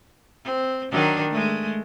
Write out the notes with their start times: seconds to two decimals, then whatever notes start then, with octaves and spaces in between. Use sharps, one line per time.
0.44 C4
0.91 D#3 F#3 D4
1.30 G#3 A3